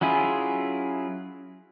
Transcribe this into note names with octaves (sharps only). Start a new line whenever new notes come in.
F#3 C#4 E4 F4 G#4